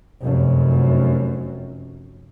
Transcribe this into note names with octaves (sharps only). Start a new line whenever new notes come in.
F1 F#2